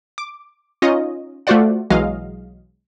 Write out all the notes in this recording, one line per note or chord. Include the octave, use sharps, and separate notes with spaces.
D6
C#4 D#4 F4 C#5 D#5
A3 F4 F#4 C5 D5 F#5
B1 E3 F#3 G#3 D#5 F5